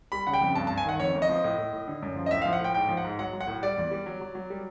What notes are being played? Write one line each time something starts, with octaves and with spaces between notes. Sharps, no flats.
G3 B5
C#3 F#5
G5
F2
G2 A5
A5
G2
G#5
D#3 F#5
F2 C#5
F2
D#5
F3
A2
A2
A2
D3
F#2
F3
D#5
A2 E5
F5
F3
F#5
A2 G5
G#2 G5
F3
F#5
G#2
F#3 F#5
F#3
F#5
A2
G3 D5
E2
G3
F#3
F#3
F#3
G3